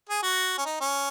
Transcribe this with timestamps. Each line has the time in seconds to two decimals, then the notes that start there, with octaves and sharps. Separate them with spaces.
0.09 G#4
0.23 F#4
0.58 C#4
0.65 D#4
0.81 C#4